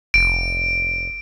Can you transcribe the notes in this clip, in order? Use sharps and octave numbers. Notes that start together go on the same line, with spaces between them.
F1 D7